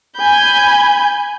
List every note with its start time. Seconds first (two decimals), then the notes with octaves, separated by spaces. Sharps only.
0.18 G#5 B5 G6